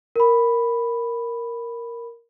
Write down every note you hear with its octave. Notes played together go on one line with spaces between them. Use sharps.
A#4 B5